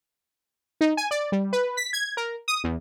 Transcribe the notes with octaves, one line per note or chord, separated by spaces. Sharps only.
D#4
G#5
D5
G3
B4
B6
G#6
A#4
D#6
E2